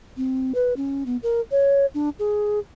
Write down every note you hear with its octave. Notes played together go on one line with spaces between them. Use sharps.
C4
B4
C#4
B3
A#4
C#5
D4
G#4